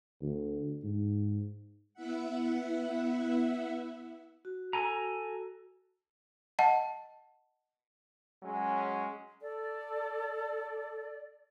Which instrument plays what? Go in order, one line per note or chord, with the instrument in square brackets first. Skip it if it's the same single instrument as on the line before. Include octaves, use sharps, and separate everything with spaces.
[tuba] D2
G#2
[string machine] B3 E4 E5 F#5
[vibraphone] F#4
[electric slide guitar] A4 G#5 A#5
[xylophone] D#5 F#5 A5
[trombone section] F#3 G#3 C#4
[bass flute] A4 [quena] D5